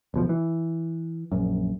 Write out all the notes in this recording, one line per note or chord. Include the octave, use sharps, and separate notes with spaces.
D1 B2 F3
E3
A#1 F#2